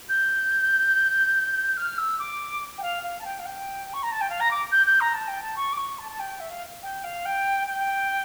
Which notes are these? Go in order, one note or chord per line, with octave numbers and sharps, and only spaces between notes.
G6
F6
E6
D6
G5
F5
F5
A5
G5
F5
G5
C#6
A#5
A5
G5
F5
A#5
D6
G6
G6
A#5
A5
G5
A5
C#6
D6
C#6
A5
A5
G5
E5
F5
G5
F5
G5
G5